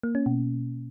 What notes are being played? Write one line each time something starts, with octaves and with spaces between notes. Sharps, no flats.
A#3
C#4
B2